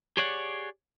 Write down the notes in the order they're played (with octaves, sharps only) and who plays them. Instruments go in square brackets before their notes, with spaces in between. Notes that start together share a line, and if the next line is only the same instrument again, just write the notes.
[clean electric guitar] G4 G#4 C#5 D5 F#5